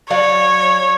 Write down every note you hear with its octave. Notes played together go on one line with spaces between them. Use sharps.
F#3 C#5 D5 F5